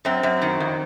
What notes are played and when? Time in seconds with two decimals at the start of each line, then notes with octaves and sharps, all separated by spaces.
0.05 F#2 C4
0.23 F#2
0.42 D#3
0.60 F2